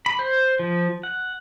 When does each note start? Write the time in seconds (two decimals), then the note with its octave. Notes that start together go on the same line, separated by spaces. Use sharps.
0.06 B5
0.19 C5
0.59 F3
1.03 F#5